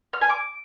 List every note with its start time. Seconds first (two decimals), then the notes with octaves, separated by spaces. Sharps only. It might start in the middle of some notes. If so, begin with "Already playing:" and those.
0.13 F6
0.21 G#5
0.29 D6